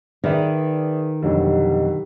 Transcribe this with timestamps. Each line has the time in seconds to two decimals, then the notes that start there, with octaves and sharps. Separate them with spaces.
0.24 D#3 G#4 B4 D5 E5
1.22 F2 B2 D3 F#3 G3 G4